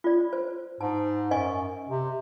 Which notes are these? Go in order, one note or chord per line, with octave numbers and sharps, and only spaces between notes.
F4 D5
C5
G#2 A5
F#2 D#5 G#5 C#6
C3